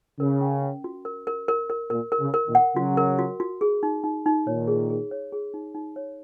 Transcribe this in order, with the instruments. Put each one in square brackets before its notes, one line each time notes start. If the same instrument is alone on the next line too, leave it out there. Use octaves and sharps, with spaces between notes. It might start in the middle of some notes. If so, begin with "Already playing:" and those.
[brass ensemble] C#3 [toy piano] A#4
[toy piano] C#4
C#4
F#4
A#4
A#4
A#4
A#4
[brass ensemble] A#2 [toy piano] A#4
[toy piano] A#4
[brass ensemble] C#3
[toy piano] A#4
[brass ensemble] A#2 D#3
[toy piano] F#5
[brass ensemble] C#3 F#3 [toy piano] F#4
[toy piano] A#4
F#4
F#4
G#4
D#4
D#4
D#4
[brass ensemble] A#2 D#3 [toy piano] C#5
[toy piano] G#4
G#4
C#5
G#4
D#4
D#4
C#5